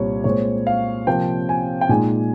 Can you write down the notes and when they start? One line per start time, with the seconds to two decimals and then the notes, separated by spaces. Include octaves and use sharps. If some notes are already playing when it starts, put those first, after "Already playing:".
Already playing: C2 A#2 G3 C4 C#5
0.24 A#2 G#3 C4 C#5
0.67 F5
1.07 C3 F3 A#3 G5
1.49 G#5
1.81 G5
1.89 A#2 G#3 D#4 G#5